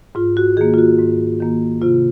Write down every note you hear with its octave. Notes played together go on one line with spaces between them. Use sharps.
G#2 F4
F#4
D#3 A#3 G#4
F4
F#4
G#2
D#3 A#3
C3 F4